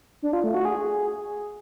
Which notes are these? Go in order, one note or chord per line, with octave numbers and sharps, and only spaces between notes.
D4
F4
A3
F#4
G#4